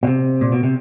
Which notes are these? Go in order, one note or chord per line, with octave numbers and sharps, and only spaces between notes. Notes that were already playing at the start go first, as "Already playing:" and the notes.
B2
C3
A#2
B2
C3